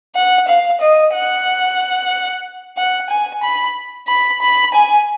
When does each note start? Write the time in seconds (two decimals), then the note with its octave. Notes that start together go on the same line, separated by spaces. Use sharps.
0.16 F#5
0.49 F5
0.81 D#5
1.14 F#5
2.78 F#5
3.10 G#5
3.44 B5
4.09 B5
4.42 B5
4.75 G#5